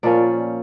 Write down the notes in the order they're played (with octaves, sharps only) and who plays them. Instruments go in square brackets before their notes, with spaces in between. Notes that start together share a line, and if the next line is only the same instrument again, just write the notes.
[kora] A#2 F3 C#4 D5